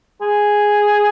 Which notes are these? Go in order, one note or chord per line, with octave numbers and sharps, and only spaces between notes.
G#4